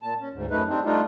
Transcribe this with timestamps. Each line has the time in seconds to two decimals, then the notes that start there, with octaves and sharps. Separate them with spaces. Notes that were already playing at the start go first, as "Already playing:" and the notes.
0.03 A#2 A5
0.21 C#4
0.33 D2 G#2
0.51 F#2 A3 D#4 B4
0.69 G3 C4 D4 D#4
0.85 G3 A3 D4 D#4 F4